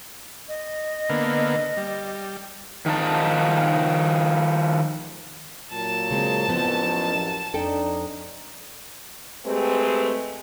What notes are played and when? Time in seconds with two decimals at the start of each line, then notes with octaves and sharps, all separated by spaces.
0.48 D#5
1.09 D3 A#3 B3
1.77 G3
2.86 D#3 F3 D#4 A5
5.72 A#2 F#3 A5
6.11 C#3 G#3 C4
6.49 A1 F#2 F3 B3 C4
7.54 F2 D4 D#4 A4 G5
9.46 G#3 A3 C4 G4 G#4 B4